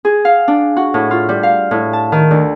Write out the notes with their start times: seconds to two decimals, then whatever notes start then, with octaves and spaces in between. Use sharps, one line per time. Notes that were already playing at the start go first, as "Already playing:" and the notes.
0.05 G#4
0.25 F5
0.48 D4
0.77 F#4
0.94 A2
1.11 F4
1.29 G3
1.43 F5
1.71 A2
1.93 A5
2.12 D#3
2.31 D2